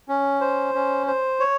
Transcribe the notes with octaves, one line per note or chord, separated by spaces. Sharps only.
C#4
C5
C#4
C5
C#5